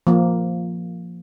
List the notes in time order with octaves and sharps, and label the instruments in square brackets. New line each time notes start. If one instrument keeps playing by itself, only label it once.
[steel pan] F3 A#3